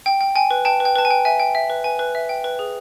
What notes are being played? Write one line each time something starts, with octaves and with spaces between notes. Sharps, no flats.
G5
G5
G5 G#5
B4
G5 A5
B4
G5
B4 A5
G#5
G5
E5 G#5
G5
E5
B4
B4 G#5
B4
E5
G5
B4
G#4